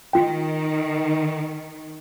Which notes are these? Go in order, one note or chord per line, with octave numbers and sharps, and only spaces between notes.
D#3 F4 G5